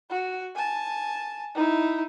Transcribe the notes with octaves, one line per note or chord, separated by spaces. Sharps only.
F#4
G#5 A5
D#4 E4